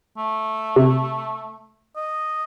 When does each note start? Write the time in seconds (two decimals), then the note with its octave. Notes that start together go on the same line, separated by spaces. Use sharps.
0.18 A3
0.76 C3
1.96 D#5